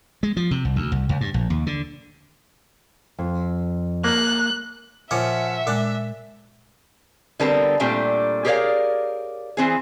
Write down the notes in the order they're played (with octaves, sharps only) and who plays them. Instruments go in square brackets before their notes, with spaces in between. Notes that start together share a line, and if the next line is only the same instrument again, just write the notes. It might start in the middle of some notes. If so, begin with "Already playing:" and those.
[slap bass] G#3
F3
C3
C2
D2
C2
C#2
G2
A#1
D#2
D3
[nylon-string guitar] F2
[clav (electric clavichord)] A#3 [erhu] F#6
[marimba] A#2 [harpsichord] F3 C#4 [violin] E5 [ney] F#5
[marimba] A#2 G#3 F#6 [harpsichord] D4
[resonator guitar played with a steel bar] D3 G3 B3 C4 A#4 A5
A#2 G3 A3 C4 D4 A#5
G4 G#4 A#4 C#5 D5 F5
E3 C4 G#4